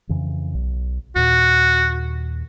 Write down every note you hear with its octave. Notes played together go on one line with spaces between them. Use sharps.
F2 C#3 E3
B1
D#2 A#2 F#4